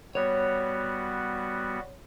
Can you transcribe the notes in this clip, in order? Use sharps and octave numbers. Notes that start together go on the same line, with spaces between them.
G3 B3 F#4 C#5